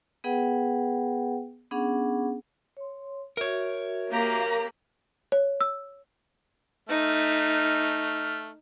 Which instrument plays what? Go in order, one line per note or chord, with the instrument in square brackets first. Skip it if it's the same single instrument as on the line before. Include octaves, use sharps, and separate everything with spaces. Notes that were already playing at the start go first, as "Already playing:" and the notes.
[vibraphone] B3 G#4 B4 F#5 G5
B3 C#4 D4 G#4 F#5
C#5 C6
[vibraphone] F#4 E5 [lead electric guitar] A#4 C#5
[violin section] A#3 [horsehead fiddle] G4 A#5
[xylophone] C#5
E6
[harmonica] A3 F6 [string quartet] D#4